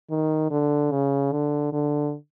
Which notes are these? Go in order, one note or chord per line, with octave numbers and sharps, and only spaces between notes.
D#3
D3
C#3
D3
D3